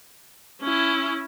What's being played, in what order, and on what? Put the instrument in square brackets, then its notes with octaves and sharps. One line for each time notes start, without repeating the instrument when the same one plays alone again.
[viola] C#4 E4